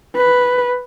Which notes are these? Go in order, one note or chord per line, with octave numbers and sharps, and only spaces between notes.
B4